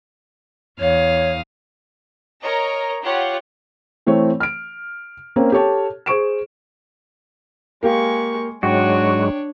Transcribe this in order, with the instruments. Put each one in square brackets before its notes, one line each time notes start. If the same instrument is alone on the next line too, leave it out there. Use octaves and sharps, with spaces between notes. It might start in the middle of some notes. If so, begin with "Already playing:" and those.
[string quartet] E2 F5 D#6 [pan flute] C#5
[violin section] A#4 C#5 D#5 A#5
F4 G4 C#5 F#5
[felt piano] E3 A3 C4 C#5
F6 D7
A#3 C4 C#4 A#4
G4 A4 C#5 A5
G#4 C5 C#6 D7 E7
[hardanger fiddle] G#3 C#6 [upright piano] A#3 G4 F5
[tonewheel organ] G#2 F#3 G#3 [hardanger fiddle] D4 C#5 [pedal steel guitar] F#4 [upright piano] G5